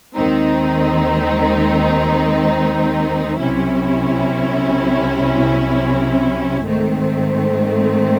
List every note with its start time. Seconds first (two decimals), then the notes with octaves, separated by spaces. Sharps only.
0.15 D#2 D#3 G#3 C4 D#4
3.39 C2 C3 F#3 C#4 E4
6.63 G#2 D#3 A3 C4